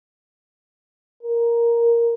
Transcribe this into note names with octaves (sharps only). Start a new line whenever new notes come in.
A#4